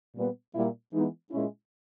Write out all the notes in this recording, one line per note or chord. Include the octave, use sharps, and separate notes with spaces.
A#2 G3 B3
A#2 G3 A#3 E4
E3 G#3 B3 D#4
A#2 G#3 C#4 E4